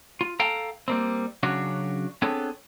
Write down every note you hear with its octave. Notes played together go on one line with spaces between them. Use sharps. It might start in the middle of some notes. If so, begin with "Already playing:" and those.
F4
A4 F5 G5 A5 A#5
G3 A#3 C4
C#3 F#3 C#4 D4 F#4
B3 C4 D4 G#4 A4 C#5